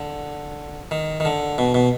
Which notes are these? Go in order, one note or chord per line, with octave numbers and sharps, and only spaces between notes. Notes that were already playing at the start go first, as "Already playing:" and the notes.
Already playing: D3
D#3
D#3
D3
B2
B2